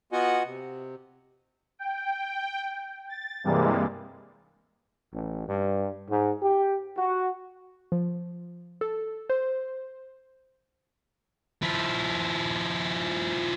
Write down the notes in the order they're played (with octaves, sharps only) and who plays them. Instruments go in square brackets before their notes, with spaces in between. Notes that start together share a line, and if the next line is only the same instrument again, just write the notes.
[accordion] B3 F4 F#4 D#5 F#5 G#5
C3
[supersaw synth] G5
A6
G2 C3 E3 G3 G#3 A#3
[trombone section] A1
G2
G#2
G4
F#4
[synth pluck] F3
A4
C5
[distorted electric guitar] F3 E4